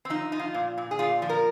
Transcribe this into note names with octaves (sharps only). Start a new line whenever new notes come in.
C4
F3 D#4
F3 D#4
F4
A#2
A#2
G#4
A#2 F4
F3
A#4